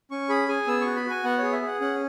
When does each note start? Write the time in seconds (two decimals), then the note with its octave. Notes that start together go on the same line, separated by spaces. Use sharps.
0.11 C#4 C#6
0.29 G#4 B5
0.48 G#4 G#5
0.67 B3 E6
0.81 F#4 C#6
0.96 B5
1.05 F#4
1.10 G#5
1.24 B3 F#5
1.38 G#4 C#5
1.53 E5
1.62 G#4 F#5
1.80 C#4 F#5